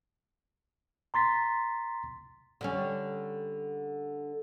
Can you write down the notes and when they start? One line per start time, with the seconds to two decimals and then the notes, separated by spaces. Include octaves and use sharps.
1.14 A#5 C6 A6 B6
2.61 D3 G3 C#4